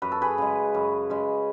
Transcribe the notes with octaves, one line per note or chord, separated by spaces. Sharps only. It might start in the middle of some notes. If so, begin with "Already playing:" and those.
F#2 B4
A4
G#4 B4
C#3 G#3
F#2
C#3 G#3